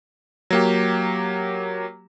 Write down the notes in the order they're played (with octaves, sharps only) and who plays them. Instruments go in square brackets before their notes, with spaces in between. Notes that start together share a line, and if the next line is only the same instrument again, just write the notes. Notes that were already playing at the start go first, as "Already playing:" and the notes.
[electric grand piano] F#3 A#3 G4